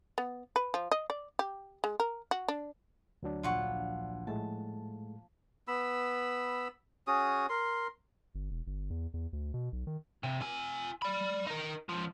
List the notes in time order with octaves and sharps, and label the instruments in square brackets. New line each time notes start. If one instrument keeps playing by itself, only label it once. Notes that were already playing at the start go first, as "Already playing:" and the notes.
[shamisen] B3
B4
F3
D#5
D5
G4
G#3
A#4
F#4
D4
[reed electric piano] D2 F#3 D4
[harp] A#1 [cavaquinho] F4 F#5 C#6
[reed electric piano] A2 G#3 A3 [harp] A5
[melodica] B3 B5 E6
C#4 F#4 G#4 D#6
A#4 C6
[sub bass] G1
E1
G1
E2
E2
D2
B2
B1
D#3
[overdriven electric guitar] C3
F4 G#5
D5 B5
D#4 A#4
C#2 F3